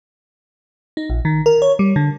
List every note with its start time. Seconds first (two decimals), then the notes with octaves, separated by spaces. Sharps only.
0.97 D#4
1.10 A#1
1.25 D#3
1.46 A#4
1.62 C#5
1.79 G3
1.96 D3